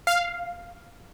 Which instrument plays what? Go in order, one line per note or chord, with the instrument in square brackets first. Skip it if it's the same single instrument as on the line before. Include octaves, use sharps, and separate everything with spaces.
[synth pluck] F5